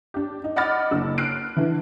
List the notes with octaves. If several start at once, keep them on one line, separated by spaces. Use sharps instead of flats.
D4 G4
D#4
D#5 F#5 B5 D6 F6 A6
F#1 D4 E6
F6 F#6 C7 D7
D3 E3